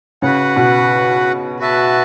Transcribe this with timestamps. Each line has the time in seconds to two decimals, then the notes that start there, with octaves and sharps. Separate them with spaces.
0.22 C#3 F#4 B4 F#5
0.56 B2
1.59 F#4 B4 E5 A5